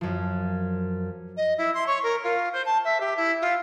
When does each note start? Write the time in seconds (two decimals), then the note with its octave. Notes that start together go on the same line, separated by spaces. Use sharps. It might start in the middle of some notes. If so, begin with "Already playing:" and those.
0.01 F#2 F3
1.36 D#5
1.57 E4
1.74 C6
1.86 C#5
2.03 A#4
2.23 F4
2.53 C5
2.65 A5
2.84 E5
3.00 G4
3.16 E4
3.41 F4